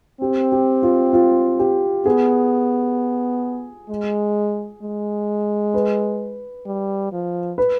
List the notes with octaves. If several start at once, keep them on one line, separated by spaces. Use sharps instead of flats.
C4 G4
G4
F4
F4
G4
B3 G#4
G#3
G#3
B4
G3
F3
B4